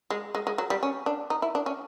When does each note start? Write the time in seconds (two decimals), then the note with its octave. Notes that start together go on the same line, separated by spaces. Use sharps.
0.10 G#3
0.35 G#3
0.47 G#3
0.58 F#3
0.70 G3
0.83 C#4
1.06 D4
1.30 D#4
1.42 E4
1.55 D4
1.66 C#4